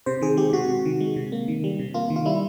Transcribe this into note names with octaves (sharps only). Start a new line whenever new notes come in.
C3 C5
D#3 G#4
G#3 G4
C3 F#4
C3
D#3
G#3
C3
A#3
D#3
G3
C3
A#3 F4
D#3
F4
G3 E4